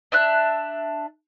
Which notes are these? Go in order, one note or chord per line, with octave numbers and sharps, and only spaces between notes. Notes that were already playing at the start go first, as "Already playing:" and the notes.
D4 E5 F#6